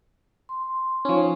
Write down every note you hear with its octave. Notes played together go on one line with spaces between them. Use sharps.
C6
F3 C#4 D#4